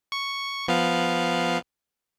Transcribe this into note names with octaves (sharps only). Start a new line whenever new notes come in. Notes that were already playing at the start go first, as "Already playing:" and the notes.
C#6
F3 B3 F5